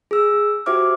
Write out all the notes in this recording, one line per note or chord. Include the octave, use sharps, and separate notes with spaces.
G#4 E6
F#4 G4 C5 E5 D6 F6